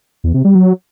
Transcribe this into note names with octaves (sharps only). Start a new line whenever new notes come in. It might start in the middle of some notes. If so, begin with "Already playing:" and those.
E2
C3
G3
F#3